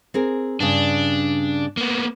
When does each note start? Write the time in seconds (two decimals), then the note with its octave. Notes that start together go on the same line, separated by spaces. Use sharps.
0.14 C4 G#4 A#4
0.60 G2 C#3 D4
1.77 A#3 B3